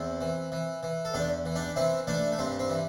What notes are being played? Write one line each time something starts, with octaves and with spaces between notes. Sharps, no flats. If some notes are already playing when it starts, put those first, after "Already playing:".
Already playing: E2 C4 E4
E3
E3
E3
A4
E2 D4 G4
E3
D4 G4
E3 C4 E4
E3 A3 D4
A3
G2 C4
C4
E3